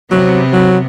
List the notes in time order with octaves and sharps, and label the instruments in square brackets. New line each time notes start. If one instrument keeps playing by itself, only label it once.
[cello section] C3 B3 [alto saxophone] F#3
[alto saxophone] F#3